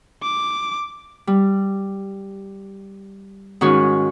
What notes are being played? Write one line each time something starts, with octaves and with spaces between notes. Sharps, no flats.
D6
G3
G#2 D#3 C#4 F#4